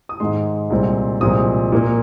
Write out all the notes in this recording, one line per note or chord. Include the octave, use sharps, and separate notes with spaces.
D#6
G#2 D#3 G#3 C6
C2 A#2 G#3 C4
C2 A#2 F3 G#3 C4 D#6
A#2 A#3